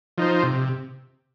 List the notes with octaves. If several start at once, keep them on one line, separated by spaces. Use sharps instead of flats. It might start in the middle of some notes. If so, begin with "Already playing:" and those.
F3 D#4 C5
C3